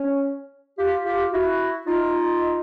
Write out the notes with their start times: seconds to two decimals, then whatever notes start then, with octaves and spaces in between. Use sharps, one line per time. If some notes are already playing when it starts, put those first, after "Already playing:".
Already playing: C#4
0.78 F4 G4
1.05 F4 G4
1.32 E4 F#4
1.86 D#4 F4